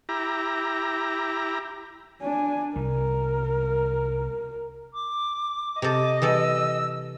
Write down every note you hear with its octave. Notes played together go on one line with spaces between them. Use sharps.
E4 G4 A#5
D4 G#5
C2 G3 A#4
D6
C3 A4 D#5 D6
E3 G3 A4 E6